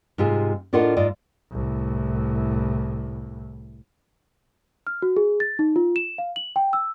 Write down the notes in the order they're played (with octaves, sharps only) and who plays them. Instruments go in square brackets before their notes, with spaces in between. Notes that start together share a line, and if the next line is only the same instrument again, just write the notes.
[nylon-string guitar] G#2 C3 F4 G#4
A2 D4 F4 A#4 D#5 F#5
G#2 F4 D5 D#5
[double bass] C2 A2
[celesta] F6
F#4
G#4
A6
D#4
F4
E7
F5
F#7
G5
E6